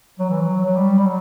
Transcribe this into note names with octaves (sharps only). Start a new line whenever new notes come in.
F#3
E3
F#3
F#3
G3
G3
F#3